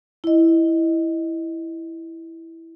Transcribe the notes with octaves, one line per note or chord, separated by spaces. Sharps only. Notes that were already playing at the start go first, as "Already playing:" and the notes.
E4 D#5